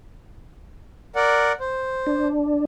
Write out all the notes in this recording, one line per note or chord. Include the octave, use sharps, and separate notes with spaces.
A#4 D5 F#5
C5
D4